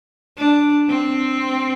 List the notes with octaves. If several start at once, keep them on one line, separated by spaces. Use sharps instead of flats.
D4
C4